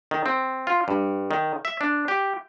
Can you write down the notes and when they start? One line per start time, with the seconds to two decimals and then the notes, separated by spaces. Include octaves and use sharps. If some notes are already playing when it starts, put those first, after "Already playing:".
0.11 D#3
0.26 C4
0.67 F4
0.88 G2
1.31 D#3
1.65 E5
1.81 D4
2.08 G4